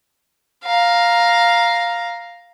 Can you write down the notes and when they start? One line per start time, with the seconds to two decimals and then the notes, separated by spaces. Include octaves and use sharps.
0.64 F5 A#5